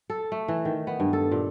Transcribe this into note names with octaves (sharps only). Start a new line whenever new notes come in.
A4
A3
E3
D#3
B3
G2
A4
A#2